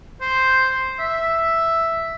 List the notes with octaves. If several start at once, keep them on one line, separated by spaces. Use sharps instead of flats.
C5
E5